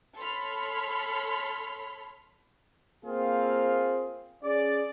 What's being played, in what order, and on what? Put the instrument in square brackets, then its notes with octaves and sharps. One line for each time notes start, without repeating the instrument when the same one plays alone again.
[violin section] A4 C#5 B5 C6 F6
[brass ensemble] A#3 C4 F4 G#4 F5
C#4 G#4 D5